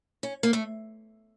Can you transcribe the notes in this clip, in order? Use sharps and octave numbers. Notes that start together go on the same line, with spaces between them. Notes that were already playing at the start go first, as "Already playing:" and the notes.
C#4
A#3
A3